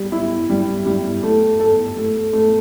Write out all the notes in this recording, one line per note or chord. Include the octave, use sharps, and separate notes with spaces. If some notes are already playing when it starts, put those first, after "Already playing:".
Already playing: G3
E4
G3
G3
A3
A4
A3
A3